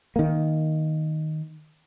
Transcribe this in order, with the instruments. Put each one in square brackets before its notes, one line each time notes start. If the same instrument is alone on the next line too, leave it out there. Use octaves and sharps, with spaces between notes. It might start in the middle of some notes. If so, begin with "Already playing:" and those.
[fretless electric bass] D#3 A#3